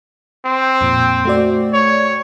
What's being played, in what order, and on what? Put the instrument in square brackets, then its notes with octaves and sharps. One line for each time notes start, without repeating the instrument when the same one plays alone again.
[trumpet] C4
[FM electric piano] F2 A#2
A3 F#4 D5
[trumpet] C#5